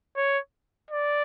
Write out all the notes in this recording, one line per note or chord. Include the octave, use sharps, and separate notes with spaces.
C#5
D5